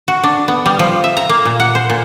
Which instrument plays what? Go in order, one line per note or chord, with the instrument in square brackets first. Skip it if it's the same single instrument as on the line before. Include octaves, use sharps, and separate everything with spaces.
[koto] F#4
D4
B3
G3
F3
E5
A#5
A#3
A#2
F#5
C5
A#2